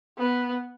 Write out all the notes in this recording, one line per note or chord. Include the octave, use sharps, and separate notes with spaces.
B3